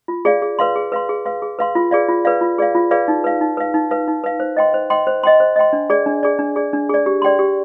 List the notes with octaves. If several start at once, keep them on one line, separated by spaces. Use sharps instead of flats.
F4
G#4 D5 F5
G#4
B4 F5 C6
G#4
B4 F5 C6
G#4
B4 F5 C6
G#4
B4 F5 C6
F4
G#4 B4 D5 F5
F4
G#4 B4 D5 F5
F4
G#4 B4 D5 F5
F4
G#4 B4 D5 F5
D#4
B4 F5
D#4
B4 F5
D#4
B4 F5
D#4
B4 F5
C5
D#5 G5 C6
C5
D#5 G5 C6
C5
D#5 G5 C6
C5
D#5 G5 C6
D4
G#4 D5
D4
G#4 D5
D4
G#4 D5
D4
G#4 D5
G4
D5 G5 C6
G4